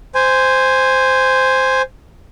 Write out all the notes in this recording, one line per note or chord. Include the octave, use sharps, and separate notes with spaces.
C5 G#5